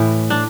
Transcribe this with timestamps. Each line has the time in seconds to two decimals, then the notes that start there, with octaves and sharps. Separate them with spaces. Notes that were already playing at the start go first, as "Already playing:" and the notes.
Already playing: A2 E3
0.30 D4